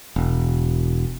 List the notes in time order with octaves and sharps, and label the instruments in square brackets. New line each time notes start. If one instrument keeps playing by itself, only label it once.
[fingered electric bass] E1